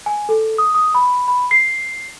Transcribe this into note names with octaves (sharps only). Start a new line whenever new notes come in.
G#5
A4
D#6
D#6
B5
B5
C7